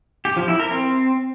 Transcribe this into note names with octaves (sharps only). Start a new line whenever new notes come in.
G4
F3
E4
A#4
C4